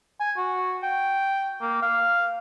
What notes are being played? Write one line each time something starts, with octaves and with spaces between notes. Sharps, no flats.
G#5
F#4
G5
A#3
F5